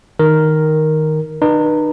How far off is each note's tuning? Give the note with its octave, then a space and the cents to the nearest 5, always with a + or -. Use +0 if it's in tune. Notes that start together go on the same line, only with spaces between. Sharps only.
D#3 +5 A#4 +0
D#4 -45 B4 -35